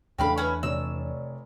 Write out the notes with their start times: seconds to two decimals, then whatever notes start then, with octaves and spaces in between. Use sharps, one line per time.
0.18 E2 C#3 E3 A3 D4 G4 F5 B5
0.38 C#4 E4 B4
0.63 F1 C#5 D5 E6